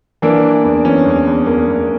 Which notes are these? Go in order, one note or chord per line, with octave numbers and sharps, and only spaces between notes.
E3 A#3 D4
E3
E2
E3 C#4
E2
E2
E2 A#3
E2